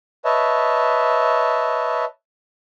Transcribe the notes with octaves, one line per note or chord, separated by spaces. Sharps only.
B4 C#5 D#5 E5 A5